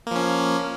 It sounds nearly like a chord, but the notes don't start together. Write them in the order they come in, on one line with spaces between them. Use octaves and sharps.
A#3 F3 C#4